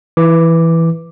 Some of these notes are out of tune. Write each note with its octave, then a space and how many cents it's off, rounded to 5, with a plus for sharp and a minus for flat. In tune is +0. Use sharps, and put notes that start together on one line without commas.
E3 +0 D6 +0